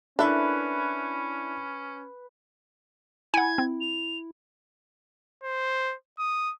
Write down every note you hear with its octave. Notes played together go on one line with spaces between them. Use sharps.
C#4 D4 E4 A4 B4 E5
E4 F#5 G#5 G#6
C4
F7
C5
D#6